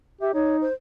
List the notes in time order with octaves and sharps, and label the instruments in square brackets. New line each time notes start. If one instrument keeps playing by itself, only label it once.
[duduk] G4 [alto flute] E5
[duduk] D#4 [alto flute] C#5
[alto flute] C5